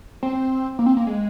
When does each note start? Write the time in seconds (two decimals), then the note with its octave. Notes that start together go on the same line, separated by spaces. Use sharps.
0.23 C4
0.79 A#3
0.86 C4
0.97 A#3
1.07 G#3